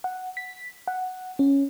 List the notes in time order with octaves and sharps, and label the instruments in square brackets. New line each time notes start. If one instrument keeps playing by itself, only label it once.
[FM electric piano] F#5
B6
F#5
C#4